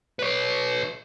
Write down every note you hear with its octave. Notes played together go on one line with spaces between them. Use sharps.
B4 C#5